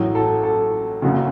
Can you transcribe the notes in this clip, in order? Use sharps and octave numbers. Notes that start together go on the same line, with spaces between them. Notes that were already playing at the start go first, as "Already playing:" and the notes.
Already playing: A1 A2 F#3
A4
A4
F#1 F#2 C#3 F#4